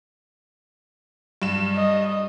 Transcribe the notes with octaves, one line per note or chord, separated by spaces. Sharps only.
G2 E7
D#5